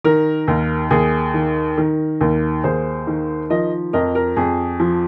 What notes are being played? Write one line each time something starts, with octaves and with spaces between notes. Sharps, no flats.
D#3 A#4
D#2
D#2 G#4
D#3
D#3 A#4
D#2
D#2 G#4 C5
D#3
F3 A#4 D#5
F2 A#4 D#5
A#4
F2 G#4
F3